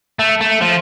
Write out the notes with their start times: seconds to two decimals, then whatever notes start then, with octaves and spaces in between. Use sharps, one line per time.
0.19 A3
0.41 A3
0.61 F3